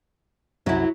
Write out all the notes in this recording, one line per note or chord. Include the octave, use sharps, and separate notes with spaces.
C2 F#2 F#3 E4